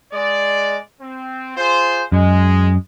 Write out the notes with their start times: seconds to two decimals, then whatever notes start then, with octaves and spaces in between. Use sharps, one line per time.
0.12 G#3 D5
1.01 C4
1.57 F4 G#4 C5
2.12 F#2 G#3